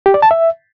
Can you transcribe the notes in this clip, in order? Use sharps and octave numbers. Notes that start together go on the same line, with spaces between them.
G4
D5
A5
E5